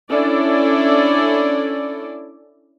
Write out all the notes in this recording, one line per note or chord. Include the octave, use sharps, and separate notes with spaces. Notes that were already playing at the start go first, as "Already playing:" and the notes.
C#4 D4 E4 A4 D5